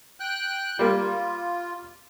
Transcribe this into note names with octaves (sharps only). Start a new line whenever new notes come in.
G5 F#6
G3 A#3 F4